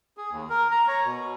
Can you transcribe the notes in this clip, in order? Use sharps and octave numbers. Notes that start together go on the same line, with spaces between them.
G#4
D#2
A#4
A#5
C#5
B2